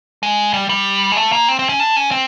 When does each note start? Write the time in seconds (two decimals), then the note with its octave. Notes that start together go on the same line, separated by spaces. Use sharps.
0.23 G#3
0.54 G3
0.69 G3
1.12 G#3
1.17 A3
1.32 A#3
1.49 C4
1.59 C4
1.69 C#4
1.80 D4
1.96 C#4
2.11 C4